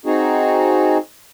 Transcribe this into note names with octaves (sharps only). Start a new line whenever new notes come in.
C4 D#4 F#4 G#4